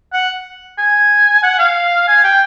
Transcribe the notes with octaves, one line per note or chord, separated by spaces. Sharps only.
F#5
G#5
F#5
F5
G#5
G5